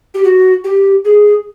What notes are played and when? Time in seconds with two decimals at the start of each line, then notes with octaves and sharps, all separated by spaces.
0.14 G4
0.24 F#4
0.64 G4
1.05 G#4